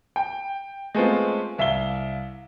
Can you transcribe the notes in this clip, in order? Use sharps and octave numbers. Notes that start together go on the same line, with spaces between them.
G5
G#3 A3 B3 C4 F4
C2 E5 F5 G7